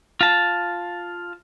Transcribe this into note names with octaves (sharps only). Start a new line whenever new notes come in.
F4 A5